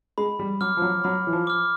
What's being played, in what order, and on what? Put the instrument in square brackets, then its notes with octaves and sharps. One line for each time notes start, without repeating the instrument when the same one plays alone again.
[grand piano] G#3 [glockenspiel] B5
[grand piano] G3
[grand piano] F#3 [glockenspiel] D6 F6
[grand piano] F3
F#3
[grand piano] F#3 [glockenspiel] B5
[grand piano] E3
F3
[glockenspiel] D6 F6